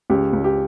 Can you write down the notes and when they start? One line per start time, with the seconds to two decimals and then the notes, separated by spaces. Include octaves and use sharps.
0.10 C#2 G4
0.33 C#2
0.44 G4